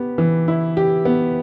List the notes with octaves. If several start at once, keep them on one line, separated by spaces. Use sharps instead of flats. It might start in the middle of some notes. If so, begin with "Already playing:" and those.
Already playing: B3 G4
E3
E4
G4
B3